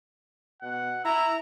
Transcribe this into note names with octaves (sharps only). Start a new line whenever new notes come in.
B2 F#5
E4 A#5 E6